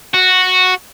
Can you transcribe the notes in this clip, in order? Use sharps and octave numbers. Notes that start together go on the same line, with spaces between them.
F#4